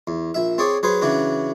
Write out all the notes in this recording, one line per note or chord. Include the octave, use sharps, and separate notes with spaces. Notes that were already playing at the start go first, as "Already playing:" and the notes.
E2
A#1 E5
C4 G#4 C#5 D5
F#3 G#4 B4 C5
C#3 E3 F#3 D4 F#4